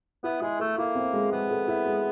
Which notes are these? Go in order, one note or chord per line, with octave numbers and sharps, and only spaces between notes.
B3 E4
G#3 E4
A3 A4
A#3 E4
C4
G#3
G#3 B3
A4
E4
G#3